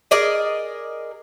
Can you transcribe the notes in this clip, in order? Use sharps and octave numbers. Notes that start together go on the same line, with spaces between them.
G#4 A#4 D5 D#5